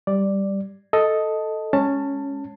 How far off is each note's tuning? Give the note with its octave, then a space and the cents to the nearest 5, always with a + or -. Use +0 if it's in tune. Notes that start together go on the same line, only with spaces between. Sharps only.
G3 +0 D5 +0
A4 +0 D#5 +5 A5 +0
G#3 +0 C#4 +0 A5 +15